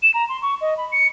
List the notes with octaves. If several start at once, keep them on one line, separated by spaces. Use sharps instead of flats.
E7
A#5
C6
C#6
D#5
B5
C#7